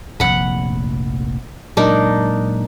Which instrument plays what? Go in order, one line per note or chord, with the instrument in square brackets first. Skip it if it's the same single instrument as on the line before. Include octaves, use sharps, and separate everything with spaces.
[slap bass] F1 A#1 [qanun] F#5 B5
[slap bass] A#2 F#3 G#3 [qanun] D4 D#4 A#4